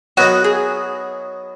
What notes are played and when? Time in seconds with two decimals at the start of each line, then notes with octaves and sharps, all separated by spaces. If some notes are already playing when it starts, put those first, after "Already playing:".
0.17 F#3 B3 D#4 F#4 A#4
0.44 G#4